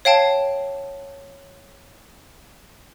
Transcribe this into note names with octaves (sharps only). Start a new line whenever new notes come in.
C#5 F5 G5 A5